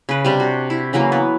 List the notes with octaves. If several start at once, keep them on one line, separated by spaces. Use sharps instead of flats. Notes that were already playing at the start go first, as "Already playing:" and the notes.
C#3 B4
C3 G3 D4
F#4
E4
C#3 E3 F#3 A#3
B3